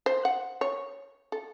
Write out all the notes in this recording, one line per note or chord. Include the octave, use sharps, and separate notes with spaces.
C5
F#5
C#5
A4